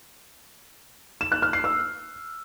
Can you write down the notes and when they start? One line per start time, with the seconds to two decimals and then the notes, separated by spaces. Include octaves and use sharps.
1.21 E7
1.32 F#6
1.42 F6
1.53 C7
1.64 E6